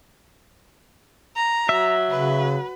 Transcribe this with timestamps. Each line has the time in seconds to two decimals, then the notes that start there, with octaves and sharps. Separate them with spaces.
1.36 A#5
1.69 F#3 E5
2.11 C#3 B4